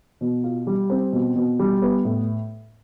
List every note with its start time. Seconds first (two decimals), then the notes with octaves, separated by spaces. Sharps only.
0.21 B2
0.44 F4
0.67 G3
0.90 C4
1.13 B2
1.36 B2
1.59 G3
1.82 B3
2.05 A2